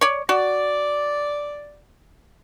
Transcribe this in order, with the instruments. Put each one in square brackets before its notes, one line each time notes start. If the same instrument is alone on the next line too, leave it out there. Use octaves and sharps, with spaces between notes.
[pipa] C#5 D5
[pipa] F#4 [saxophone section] D5